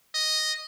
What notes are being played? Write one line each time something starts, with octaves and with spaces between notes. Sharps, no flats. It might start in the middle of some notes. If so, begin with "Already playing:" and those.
D#5